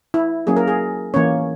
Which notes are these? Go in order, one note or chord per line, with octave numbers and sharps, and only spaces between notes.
E4
F#3 A#3 C#4 G#4
A#4
G#4
E3 A#3 C#4 C#5